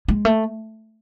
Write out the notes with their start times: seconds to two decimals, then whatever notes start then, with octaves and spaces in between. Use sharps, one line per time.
0.08 G#3
0.25 A3